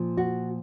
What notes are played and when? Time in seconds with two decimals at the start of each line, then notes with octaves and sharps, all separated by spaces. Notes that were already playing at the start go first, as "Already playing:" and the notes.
Already playing: A#2 F3
0.17 F#4